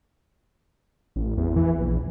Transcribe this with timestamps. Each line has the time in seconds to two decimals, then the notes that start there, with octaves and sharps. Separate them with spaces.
1.16 A1
1.37 E2
1.56 E3
1.79 A#1